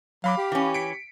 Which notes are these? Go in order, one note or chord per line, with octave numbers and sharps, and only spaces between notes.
F#3 F5 B5 D6
G4
E3 C#4
B6 C#7 D7